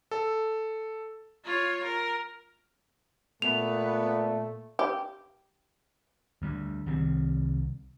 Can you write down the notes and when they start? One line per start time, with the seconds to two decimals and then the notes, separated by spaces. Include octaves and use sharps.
0.11 A4
1.44 F4 C#5
1.84 A#4
3.42 A#2 A3 B3 F7
4.79 G4
6.42 D2 G3
6.86 C2 D#3 G3 C4